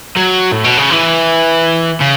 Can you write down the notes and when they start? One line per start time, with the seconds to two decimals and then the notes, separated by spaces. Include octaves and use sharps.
0.17 F#3
0.52 A2
0.64 B2
0.78 C#3
0.91 E3
2.01 C#3